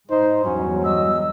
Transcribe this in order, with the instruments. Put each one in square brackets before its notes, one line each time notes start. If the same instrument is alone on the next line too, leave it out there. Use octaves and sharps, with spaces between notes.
[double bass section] G#2 [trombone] D#4 [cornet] C5
[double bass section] E2 G2 [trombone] F#3 [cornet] C#4
[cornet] D#5 [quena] E6